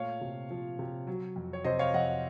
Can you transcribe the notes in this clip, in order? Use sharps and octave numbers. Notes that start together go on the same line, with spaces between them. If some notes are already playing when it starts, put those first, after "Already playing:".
Already playing: A#2 A3 C#5 F5
C3
F3
C3
F#3
F2
C#5
C3 C5 D#5
C#5 F5
F2 D#5 F#5